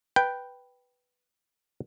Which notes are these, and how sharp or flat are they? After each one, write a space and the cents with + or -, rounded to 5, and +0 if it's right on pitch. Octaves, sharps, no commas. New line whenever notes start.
B4 +0 G5 +0